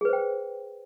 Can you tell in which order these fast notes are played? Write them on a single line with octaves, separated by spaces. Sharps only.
G#4 B4 C5 G5